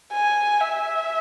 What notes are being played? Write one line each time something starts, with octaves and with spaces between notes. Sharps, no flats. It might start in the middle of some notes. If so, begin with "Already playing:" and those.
G#5
E5